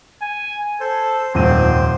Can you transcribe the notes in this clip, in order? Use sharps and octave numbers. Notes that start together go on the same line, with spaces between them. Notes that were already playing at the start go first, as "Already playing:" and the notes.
G#5
A4 C5
D#1 F2 G#2 C4 C5 D#7